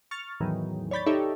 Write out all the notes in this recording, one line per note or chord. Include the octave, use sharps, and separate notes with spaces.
C#6 F6 A6
E2 A2 D#3 E3 F#3
C#5 D5 B5 G6 A6
D#4 G4 A4 C#5 D5 E5